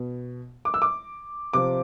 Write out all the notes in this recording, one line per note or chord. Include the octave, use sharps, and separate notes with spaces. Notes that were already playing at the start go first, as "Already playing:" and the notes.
Already playing: B2
D6
E6
D6
C3 F3 D6